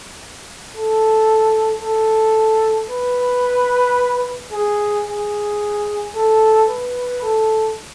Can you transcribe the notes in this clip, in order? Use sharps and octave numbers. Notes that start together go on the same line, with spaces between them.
A4
A4
B4
G#4
G#4
A4
B4
A4